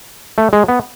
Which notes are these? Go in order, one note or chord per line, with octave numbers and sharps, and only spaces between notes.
A3
G#3
B3